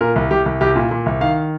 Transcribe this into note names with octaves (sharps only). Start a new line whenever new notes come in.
A#2 A#4
C2
C2 G4
C2
C2 G4
A#2
A#2
C2
D#3 F5